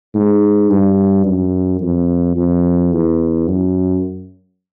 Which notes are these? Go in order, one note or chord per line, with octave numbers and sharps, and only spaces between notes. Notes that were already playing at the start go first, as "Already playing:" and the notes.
G#2
G2
F#2
F2
F2
E2
F#2